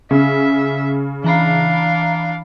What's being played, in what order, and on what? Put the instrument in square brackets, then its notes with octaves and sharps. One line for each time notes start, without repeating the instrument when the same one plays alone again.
[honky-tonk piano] C#3 [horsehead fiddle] E5
[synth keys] E3 A#5 B5 [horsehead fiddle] D4 F5